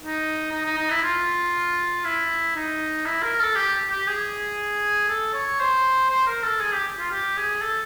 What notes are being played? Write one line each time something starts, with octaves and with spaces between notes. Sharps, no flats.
D#4
D#4
D#4
D#4
E4
F4
E4
D#4
E4
A#4
A4
G4
G4
G#4
A4
C#5
C5
C5
A#4
A4
G#4
G4
F4
G4
G#4
A4